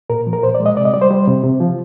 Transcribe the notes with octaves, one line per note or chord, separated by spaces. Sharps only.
A#2 A#4
F3
A#4
A#2 C5
D5
G#3
D#5
C3 D5
D#5
G3 D5
C5
G3
C3
C3
F3